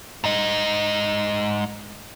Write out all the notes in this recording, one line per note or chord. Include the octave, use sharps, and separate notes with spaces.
G#2 D#5